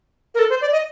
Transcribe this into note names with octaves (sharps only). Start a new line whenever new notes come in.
A#4
A4
C5
D5
D#5